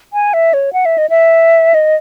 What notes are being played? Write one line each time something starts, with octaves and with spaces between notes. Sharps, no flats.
G#5
E5
C#5
F#5
E5
D#5
E5
D#5